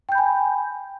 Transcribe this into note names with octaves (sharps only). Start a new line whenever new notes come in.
G5 G#5 B5 G6